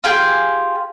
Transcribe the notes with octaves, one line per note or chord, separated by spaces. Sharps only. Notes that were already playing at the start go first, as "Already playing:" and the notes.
F4 G4 G#4